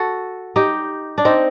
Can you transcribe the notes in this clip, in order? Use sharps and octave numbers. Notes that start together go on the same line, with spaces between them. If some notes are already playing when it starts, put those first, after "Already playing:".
Already playing: F#4 A4
D#4 G4
D4
C4 D#4